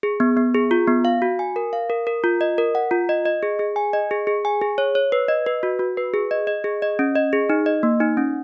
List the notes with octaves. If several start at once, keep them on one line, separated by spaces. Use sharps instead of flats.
G#4
B3
B3
G#4
F4
B3
F5
F#4
G#5
A#4
F5
A#4
A#4
F4
D#5
A#4
F#5
F4
D#5
D#5
G#4
G#4
G#5
D#5
G#4
G#4
G#5
G#4
C#5
C#5
B4
D#5
B4
F#4
F#4
B4
G#4
D#5
D#5
G#4
D#5
C#4
D#5
G#4
D#4
D#5
A#3
D#4
C#4